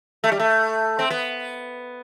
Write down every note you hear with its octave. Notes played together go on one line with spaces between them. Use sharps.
A3
G3
A3
C4
B3